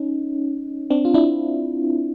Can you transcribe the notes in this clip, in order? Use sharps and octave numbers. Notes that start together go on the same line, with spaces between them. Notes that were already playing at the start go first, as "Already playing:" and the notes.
Already playing: C#4 D#4
C4 D4
F4
D4 E4